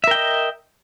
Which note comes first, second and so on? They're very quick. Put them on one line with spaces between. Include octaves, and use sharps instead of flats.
E5 A#4 G5 D#5